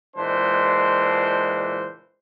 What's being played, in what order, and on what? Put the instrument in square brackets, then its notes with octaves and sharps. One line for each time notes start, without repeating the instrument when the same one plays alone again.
[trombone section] C#2 A#2 E3 G#3 D4 C5